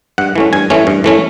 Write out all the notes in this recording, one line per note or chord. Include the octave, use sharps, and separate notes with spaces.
G2 F#5
E3 A3 C#4
G2 G#5
E3 A3 C#4
G2
E3 A3 C#4